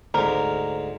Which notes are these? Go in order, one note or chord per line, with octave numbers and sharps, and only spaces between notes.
D2 G#2 A#4